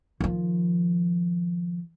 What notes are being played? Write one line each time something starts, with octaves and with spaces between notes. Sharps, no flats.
D#3 F3